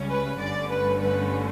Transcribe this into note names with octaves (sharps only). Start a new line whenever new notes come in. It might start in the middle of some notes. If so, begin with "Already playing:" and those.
Already playing: C#2 C#3 G3 C#4
B4
G1 G2 D3 A3 C#4 D5
B4
B4